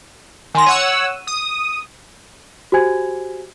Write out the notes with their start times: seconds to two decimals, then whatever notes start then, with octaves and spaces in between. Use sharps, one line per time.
0.55 D#3 G#5 C6 A#6
0.66 C#5 F#5 E6 D#7
1.27 D#6
2.72 F#4 G4 C5 G#5 G#6